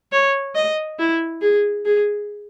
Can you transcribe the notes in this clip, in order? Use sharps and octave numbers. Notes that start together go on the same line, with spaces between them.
C#5
D#5
E4
G#4
G#4